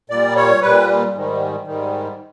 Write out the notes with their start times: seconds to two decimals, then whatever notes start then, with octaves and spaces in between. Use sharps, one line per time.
0.10 A#2 G3 D5
0.36 C#5
0.62 A#2 G3 B4
1.14 G#2 D#3 G3
1.66 G#2 D#3 G3